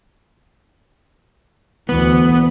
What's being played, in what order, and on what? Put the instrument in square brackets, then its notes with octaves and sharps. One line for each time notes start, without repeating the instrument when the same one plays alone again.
[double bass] D2 E3 [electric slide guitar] B3